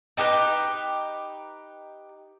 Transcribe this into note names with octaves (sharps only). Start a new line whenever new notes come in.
D#4 G4 A#4 B4